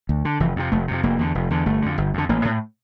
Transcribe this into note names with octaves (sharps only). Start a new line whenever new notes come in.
D2
D3
F1 E3
F2 C3
F1 A3
F2 C3
F1 A#3
E2 D3
F1
E2 D3
G1 A3
F2 D3
G1
F2 D3
A1 A#3
A2